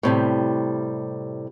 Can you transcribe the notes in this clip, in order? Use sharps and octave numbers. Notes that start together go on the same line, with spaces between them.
A2 C3 G3